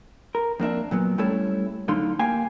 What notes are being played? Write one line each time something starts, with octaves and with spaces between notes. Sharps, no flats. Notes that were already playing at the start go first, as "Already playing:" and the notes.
A#4
F2 A#3 D4 E5
A#2 F#3 B3
G3 A3 C#4 E4 A4 C#5
F#2 A2 D3 D#4 F5 C6
A#3 G4 F5 G5 G#5